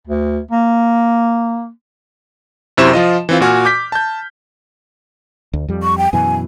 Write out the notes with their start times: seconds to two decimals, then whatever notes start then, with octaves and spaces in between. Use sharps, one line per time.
0.07 D2
0.51 A#3
2.77 F#2 C3 E4 C5 C#6 E7
2.93 F3 F4 D#5
3.29 E3 C4 F4
3.40 A#2 F#4 G#5 F6
3.65 D6 G6 B6
3.92 A5 G6
5.53 D2
5.68 F2 G3
5.83 C#6
5.98 G5
6.13 F#2 B2 E3 G#5